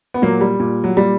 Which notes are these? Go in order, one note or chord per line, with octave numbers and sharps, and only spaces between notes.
B3
A#2 F#3 A#3
G3
A#2
F#3
A#2 G3